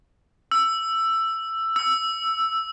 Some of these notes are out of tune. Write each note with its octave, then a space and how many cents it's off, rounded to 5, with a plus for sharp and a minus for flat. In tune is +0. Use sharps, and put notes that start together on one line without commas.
E6 +10
E6 +0